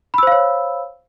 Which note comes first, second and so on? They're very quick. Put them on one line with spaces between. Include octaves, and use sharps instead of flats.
B5 E6 C5 F5 C#5